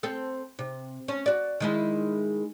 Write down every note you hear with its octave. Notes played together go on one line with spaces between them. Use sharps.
C4 A4
C3
C#4
F#4 D5
D#3 G#3 E4